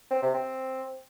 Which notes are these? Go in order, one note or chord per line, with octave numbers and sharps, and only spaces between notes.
C4
C3
C4